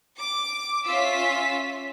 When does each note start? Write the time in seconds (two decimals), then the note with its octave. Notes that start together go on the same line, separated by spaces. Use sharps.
0.19 D6
0.86 C#4 F4 E5 E6 B6